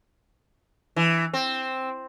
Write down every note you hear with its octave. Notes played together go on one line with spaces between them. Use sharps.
E3
C4